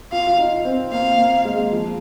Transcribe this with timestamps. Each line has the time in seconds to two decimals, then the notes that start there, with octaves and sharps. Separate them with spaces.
0.12 F4 F5
0.27 F4
0.39 D#4
0.65 C4
0.92 A#3 F5
1.18 A#3
1.45 G#3
1.72 F3